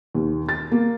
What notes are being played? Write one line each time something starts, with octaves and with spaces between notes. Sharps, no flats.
D#2
A6
A#3